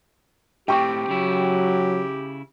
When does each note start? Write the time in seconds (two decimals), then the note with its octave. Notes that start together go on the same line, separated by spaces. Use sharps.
0.68 A2 C4 G4 G5 C#6
1.08 C#3 F#3 E4